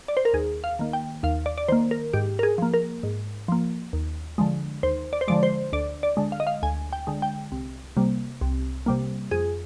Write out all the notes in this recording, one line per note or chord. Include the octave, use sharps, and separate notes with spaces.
D5
C5
A#4
D#2 G#4
F5
D#3 A#3
G5
D#2 F5
D5
D5
D#3 A#3 C5
A#4
G#2 G4
A#4
G#4
F3 A#3
A#4
G#2
F3 A#3
D#2
D3 F3 G#3
D#2 C5
D5
C5
D3 F3 G#3 D5
C5
D2 D5
D5
D3 G#3
F5
D#5
F5
D2 G#5
G5
D3 G#3
G5
C2
C3 G3 A#3
C2
C3 G3 A#3
F2 G#4